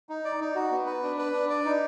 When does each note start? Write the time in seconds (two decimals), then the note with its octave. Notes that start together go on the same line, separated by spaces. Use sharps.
0.09 D#4
0.25 D5
0.41 D#4
0.55 F#4
0.71 B3
0.86 B4
1.03 D4
1.18 B4
1.33 D4
1.49 D5
1.65 D#4